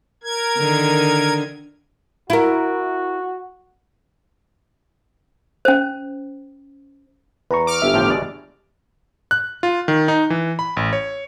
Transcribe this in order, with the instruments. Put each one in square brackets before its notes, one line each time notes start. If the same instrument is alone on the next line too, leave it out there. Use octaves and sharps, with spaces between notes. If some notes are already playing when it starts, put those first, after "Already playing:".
[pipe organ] A#4 G#6
[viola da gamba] D3 D#3
[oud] E4 A#4 [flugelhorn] F#4
[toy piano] C#4 C5
[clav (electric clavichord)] E2 [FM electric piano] B4 A#5 C#6
[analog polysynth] D6 F6
[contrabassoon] G1 [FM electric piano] G4 E5
[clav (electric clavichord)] A2 F3 G5
B2 G#3 D5
[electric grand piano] F#6
F4
D#3
D#4
E3
B5
A1
C#5